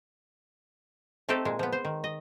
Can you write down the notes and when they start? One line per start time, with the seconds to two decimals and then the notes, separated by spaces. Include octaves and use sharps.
1.29 A3 C4 D#4 G4 A4
1.45 A#2 G#3
1.59 F3 B3
1.72 C5
1.85 D#3
2.04 D#5